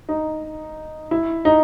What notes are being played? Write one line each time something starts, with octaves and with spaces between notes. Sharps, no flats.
D#4
E4
D#4